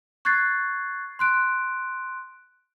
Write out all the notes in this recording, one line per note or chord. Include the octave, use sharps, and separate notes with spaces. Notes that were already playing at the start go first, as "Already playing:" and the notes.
C#6 F#6 G#6 A6 C7
C6 F#6 D7